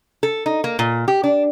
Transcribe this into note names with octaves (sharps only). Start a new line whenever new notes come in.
A4
D#4
A#3
A#2
G4
D4